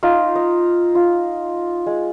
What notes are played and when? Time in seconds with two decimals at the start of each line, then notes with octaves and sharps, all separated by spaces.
0.03 D#4 F4 F5
0.35 D#5
0.95 F4
1.86 G#3